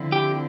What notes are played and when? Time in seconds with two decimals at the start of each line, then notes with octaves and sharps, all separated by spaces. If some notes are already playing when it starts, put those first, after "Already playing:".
Already playing: D3 F3 C4 E4
0.12 G4